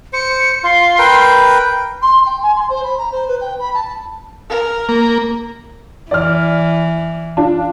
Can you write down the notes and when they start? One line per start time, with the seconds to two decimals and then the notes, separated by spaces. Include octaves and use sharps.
0.13 C5 C#7
0.63 F4 C6
0.99 A#4 B4 G5
2.01 C6
2.25 G5
2.42 G#5
2.55 C6
2.69 C5
2.83 B5
2.97 A#5
3.11 C5
3.27 B4
3.40 G5
3.59 B5
3.74 A5
4.49 A#4
4.89 A#3
6.11 E3 D5 F6
7.37 D4 F4